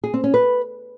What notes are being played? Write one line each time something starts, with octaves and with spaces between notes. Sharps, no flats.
G#4
C4
C#4
B4